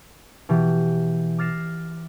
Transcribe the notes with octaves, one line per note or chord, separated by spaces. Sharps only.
B2 E3 G4
D6 F6 A6 A#6 C7 E7